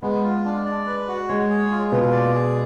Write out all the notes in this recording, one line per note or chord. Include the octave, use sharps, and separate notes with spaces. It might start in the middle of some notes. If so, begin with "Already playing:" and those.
G#3 B3
F4
D4
D5
B4
F#4
G#3 C#5
G#4
F4
B2 B3 F4
D5
G#4